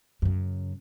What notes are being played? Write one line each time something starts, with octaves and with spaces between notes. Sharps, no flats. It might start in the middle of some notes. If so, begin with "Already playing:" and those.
F#2 C#3